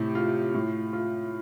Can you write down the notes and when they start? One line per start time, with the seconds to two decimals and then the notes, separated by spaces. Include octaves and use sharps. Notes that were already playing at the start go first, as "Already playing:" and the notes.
Already playing: A2 C3
0.15 F4
0.54 A2
0.93 F4